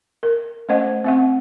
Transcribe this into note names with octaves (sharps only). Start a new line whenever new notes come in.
A#4
A3 C#4 C5 D#5 F#5
C4 E5 F#5